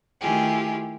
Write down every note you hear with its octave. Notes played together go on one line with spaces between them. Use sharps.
D#3 A3 E4 F4 G4 G#4